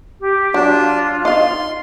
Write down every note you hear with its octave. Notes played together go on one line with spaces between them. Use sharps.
G4
F#3 D4
F4
D#4 F5 C6